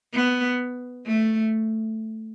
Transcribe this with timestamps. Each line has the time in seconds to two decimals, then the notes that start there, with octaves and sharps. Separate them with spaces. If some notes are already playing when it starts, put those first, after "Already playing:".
0.13 B3
1.06 A3